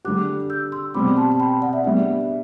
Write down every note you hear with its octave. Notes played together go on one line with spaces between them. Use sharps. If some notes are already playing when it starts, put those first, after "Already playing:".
D3 G3 D4 G4 D6 F#6
E6 G6
C6 E6
B2 G3 C4 B5 D6
A5 C6
A5
G5 B5
D5 F#5
E5
G3 B3 D4 E5